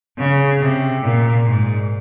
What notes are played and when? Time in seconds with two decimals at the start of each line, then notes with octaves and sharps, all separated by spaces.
0.18 C#3
0.61 C3
1.03 A#2
1.45 G#2